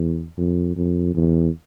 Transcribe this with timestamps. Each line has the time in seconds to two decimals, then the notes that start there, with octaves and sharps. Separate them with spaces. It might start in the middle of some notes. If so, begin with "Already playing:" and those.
Already playing: E2
0.38 F2
0.76 F2
1.15 E2